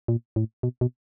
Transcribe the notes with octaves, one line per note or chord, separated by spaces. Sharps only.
A#2
A2
B2
B2